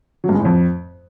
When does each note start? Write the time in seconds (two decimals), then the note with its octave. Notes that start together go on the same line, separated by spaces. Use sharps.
0.24 F#3
0.29 G2
0.34 G#3
0.40 A2
0.45 F2